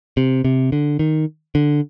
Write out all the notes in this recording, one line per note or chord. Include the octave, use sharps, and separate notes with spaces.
C3
C3
D3
D#3
D3